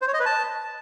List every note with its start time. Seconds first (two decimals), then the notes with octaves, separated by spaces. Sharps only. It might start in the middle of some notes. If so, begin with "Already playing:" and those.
0.02 C5
0.08 C#5
0.14 D#5
0.20 B4
0.26 A5